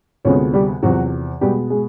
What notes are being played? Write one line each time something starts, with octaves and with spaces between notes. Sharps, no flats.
D2 C3 F3 G#3 B3 C#4 C#5
G3 G4
E2 C3 F3 F#3 F#4
B2 G3 G#3 B3 G4
G#3 G#4